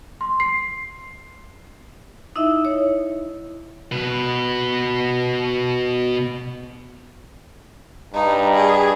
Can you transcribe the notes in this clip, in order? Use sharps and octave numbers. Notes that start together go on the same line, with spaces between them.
C6
C7
D#4 E4 D#5 E5
C#5
B2 B4
G2 D#4
G#4